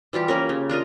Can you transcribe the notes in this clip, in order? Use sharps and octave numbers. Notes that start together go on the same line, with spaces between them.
E3 G3 F4 G4
A#3 C#4 A#4
C#3
D4 F4 A#4 D#5